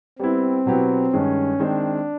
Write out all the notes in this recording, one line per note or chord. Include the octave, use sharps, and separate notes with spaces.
G3 B3 C4 E4
B2 F#3 B3 E4 G4
G2 D#3 G#3 C#4
D#3 G#3 C4 D4